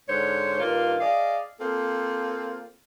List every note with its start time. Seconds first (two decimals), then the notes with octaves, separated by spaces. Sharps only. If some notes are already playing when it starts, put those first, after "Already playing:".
0.09 G#2 D3 C5 C#5
0.60 G2 D#3 A#3 F4
1.01 G#4 D5 D#5 F5
1.60 A#3 C4 F4 A4